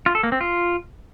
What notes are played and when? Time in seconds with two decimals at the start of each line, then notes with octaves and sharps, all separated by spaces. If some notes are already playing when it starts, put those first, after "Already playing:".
0.06 F4
0.15 A4
0.23 A#3
0.32 C4
0.41 F4